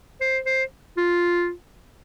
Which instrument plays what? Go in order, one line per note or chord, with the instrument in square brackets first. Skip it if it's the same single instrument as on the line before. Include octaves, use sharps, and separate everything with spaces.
[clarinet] C5
C5
F4